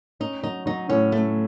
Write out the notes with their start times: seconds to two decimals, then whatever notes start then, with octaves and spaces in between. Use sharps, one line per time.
0.20 C#4 D#4
0.43 F#3 D#4
0.66 F#3 D#4
0.89 A2 C#4
1.12 A3 C#4